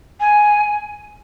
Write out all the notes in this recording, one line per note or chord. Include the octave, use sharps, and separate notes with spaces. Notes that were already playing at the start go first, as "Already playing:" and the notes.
G#5